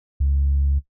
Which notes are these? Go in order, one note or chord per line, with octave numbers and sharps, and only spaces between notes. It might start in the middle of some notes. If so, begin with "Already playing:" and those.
C#2